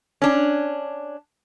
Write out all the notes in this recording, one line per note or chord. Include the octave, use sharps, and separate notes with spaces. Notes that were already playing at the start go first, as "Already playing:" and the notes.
C#4 D4